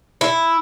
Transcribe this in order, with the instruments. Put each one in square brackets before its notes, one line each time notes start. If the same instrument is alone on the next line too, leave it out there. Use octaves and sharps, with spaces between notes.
[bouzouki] E4